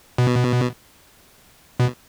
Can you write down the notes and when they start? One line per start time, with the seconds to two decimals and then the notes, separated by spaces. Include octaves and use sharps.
0.18 B2
1.80 B2